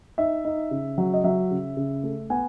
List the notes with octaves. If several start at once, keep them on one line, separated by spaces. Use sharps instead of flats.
D#4 E5
D#4
C#3
F#3
D#5
F#3 E5
C#3
C#3
A3
B3 G#5